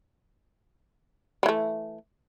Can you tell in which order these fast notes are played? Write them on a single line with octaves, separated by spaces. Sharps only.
G3 E3 A3